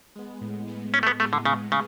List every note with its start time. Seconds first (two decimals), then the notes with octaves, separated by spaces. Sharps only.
0.16 G#3 B3
0.41 A2
0.68 G#3 B3
0.94 A2 C#4
1.03 A3
1.07 B3
1.19 G#3 A3
1.23 B3
1.33 D3
1.45 A2 C#3
1.72 C#3 G#3